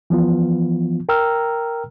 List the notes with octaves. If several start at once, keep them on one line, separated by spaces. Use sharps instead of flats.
E3 F3 B3 F4
A#4 G5 A#5 E6 F6